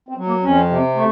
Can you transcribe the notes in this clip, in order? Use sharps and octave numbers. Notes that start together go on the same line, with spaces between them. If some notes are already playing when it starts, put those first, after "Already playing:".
C4
F#3
A#3
F2 C#4
C3
A3